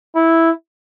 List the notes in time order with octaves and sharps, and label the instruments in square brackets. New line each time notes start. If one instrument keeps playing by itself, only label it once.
[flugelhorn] E4